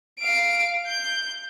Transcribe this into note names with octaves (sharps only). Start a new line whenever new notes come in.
F5 D7
G6